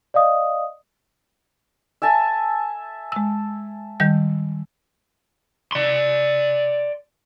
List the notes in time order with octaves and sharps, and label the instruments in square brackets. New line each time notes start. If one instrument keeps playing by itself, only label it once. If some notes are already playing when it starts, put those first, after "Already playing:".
[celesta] D5 D#5 F5 D#6
[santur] E5 G#5 A5
[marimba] G#3 E6
D#3 G3 G6
[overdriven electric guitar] D5 C6